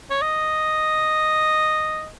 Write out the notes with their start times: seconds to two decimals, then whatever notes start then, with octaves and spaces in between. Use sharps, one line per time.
0.10 C#5
0.22 D#5